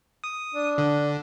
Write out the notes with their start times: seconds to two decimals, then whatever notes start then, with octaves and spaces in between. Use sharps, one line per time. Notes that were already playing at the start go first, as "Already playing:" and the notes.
0.24 D#6
0.54 D4
0.78 D3